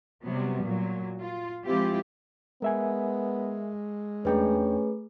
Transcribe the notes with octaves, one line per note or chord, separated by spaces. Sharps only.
C3 F#3 G3 B3
A#2 F#3
F4
F3 G#3 C4 E4 F4 G4
G#3 B3 A#4 E5 G#5
E2 A3 C#4 D4 G#4 B4 G5